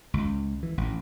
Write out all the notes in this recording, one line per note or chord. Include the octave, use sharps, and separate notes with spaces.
C#2
E3
A1